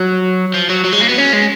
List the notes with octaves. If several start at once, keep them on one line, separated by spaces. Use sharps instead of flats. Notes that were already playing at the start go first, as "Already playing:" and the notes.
Already playing: F#3
F3
F#3
F#3
G#3
A#3
B3
C#4
G#3